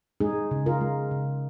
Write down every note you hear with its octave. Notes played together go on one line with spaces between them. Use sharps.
G#3 D#4 G#4
C#3
F4 A#4
G#3
C#3